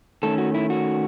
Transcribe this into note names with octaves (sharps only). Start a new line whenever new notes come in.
D#3 A3 C#4 A4
F#4
E4
F#4